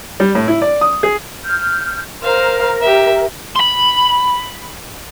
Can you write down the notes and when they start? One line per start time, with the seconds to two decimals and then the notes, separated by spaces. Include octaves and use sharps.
0.20 G3
0.35 A2
0.48 E4
0.62 D5
0.81 D#6
1.03 G#4
1.44 F6 G6
2.22 A#4 C5 F5
2.82 G4 E5
3.56 B5 C6